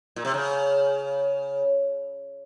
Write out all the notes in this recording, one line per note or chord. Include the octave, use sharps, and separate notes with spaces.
A#2
C3
C#3